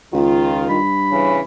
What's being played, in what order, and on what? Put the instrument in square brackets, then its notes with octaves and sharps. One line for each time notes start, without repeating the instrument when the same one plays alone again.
[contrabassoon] C#2 [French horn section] D#3 F4
[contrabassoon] G2 [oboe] B5
[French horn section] C#3 E3 C#4